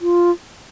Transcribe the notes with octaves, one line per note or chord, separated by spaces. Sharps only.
F4